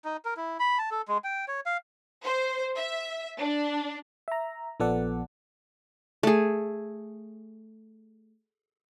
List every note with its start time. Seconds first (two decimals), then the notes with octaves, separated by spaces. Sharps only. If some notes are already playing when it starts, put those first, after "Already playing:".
0.05 D#4
0.25 A#4
0.37 E4
0.59 B5
0.78 A5
0.91 A4
1.08 G#3
1.24 G5
1.48 C#5
1.66 F5
2.24 C5
2.77 E5
3.41 D4
4.28 E5 A#5
4.80 A#1 F3 B3 A4 D5 F#5
6.23 A3 G#4